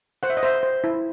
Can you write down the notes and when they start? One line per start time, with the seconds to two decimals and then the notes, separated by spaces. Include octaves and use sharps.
0.23 C5 F#5
0.30 E5
0.37 D#5
0.43 C5 E5
0.63 C5
0.84 E4